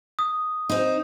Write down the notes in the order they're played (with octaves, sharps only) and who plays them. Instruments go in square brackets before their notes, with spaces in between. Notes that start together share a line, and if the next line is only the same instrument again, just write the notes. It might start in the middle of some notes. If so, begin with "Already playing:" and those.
[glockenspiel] D#6
[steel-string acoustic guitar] C4 D#4